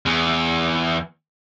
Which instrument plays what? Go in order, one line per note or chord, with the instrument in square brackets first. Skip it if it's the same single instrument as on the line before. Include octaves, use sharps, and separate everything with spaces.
[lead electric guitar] E2